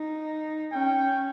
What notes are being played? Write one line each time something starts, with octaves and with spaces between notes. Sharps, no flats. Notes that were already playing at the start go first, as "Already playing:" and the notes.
Already playing: D#4
C#4 G5